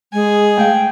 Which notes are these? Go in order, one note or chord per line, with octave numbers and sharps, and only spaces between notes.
G#3 G#4 G#5
A3 F5 G5